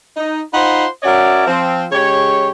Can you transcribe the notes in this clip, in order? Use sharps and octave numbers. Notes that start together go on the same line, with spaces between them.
D#4
D#4 F4 C5 F#5 B5 C6
C#4 F#4 A#4 C#5 D5 E5
F3 C4
C#3 G#3 G4 C#5